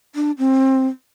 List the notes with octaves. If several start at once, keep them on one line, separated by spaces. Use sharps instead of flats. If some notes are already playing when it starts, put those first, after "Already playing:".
D4
C4